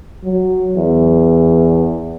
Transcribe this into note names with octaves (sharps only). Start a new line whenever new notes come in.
F#3
E2